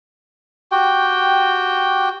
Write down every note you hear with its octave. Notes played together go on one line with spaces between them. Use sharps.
F#4 G4 G5